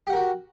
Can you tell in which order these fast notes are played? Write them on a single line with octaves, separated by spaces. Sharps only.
G4 F#5 A#4 F#4